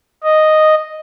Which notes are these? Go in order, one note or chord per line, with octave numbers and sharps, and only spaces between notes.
D#5